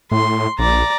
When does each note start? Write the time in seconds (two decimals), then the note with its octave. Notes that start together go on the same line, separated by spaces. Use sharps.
0.11 A2 C6
0.59 A#1 D5 A#5